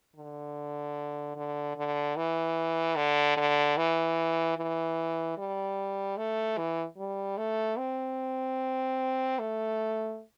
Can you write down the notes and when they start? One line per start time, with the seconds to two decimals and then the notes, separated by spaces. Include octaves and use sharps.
0.16 D3
1.36 D3
1.76 D3
2.16 E3
2.96 D3
3.37 D3
3.77 E3
4.57 E3
5.38 G3
6.17 A3
6.58 E3
6.98 G3
7.37 A3
7.78 C4
9.39 A3